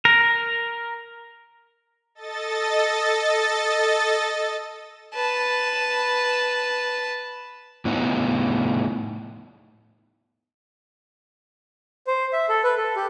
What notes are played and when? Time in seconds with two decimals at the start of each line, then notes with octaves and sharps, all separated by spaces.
0.05 A#4
2.15 A4 D#5 A6
5.14 B4 A5
7.85 A2 B3 D#4
12.07 C5
12.33 E5
12.49 A4
12.64 B4
12.78 A4
12.96 G4